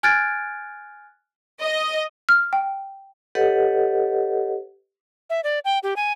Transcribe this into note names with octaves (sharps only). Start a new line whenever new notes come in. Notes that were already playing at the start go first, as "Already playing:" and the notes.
G#5 F6 F#6 G#6 A6 D7
D#5
F6
G5
G4 A4 B4 C#5 D#5 F#5
E5
D5
G5
G4
G#5